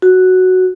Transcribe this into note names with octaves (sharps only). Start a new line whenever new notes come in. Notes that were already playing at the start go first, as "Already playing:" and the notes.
F#4